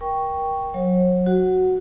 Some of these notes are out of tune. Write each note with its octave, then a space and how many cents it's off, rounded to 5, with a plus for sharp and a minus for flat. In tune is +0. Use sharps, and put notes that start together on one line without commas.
A#4 +25 G5 +0 C#6 +0
F#3 -15 C#5 -45
F#4 +0 F#5 +0